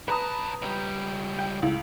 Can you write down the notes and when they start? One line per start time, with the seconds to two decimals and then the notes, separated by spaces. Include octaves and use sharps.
0.08 B1 B4 A5 A#5 D#6
0.62 C#2 G3
1.39 G5
1.62 C#2 A2 E4